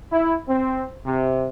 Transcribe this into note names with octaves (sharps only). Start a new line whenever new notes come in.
E4
C4
C3